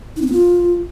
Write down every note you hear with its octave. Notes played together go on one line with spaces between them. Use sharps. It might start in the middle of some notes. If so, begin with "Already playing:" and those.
D#4
C4
B3
F4